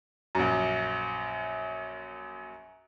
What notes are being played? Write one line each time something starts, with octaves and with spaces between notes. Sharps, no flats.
A#1 F#2